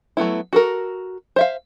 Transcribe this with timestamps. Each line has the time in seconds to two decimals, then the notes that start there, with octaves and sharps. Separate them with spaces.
0.17 F#3 A3 B3 E4
0.53 F#4 A4 A#4
1.36 C5 E5 F5